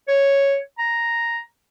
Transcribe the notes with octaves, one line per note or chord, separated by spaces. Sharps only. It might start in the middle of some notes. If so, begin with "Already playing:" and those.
C#5
A#5